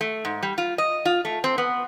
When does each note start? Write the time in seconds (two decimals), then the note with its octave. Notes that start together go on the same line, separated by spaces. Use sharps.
0.01 A3
0.25 G#2
0.43 G3
0.58 F4
0.78 D#5
1.05 F4
1.25 A3
1.44 C4
1.58 B3